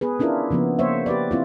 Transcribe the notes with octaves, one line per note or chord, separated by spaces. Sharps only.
B3 G#4 B4
C#4 D4 E4 F4 A#4
C#3 F3 A#3 B3
A#3 C5 C#5 E5
G4 B4 D5
C4 E4 F4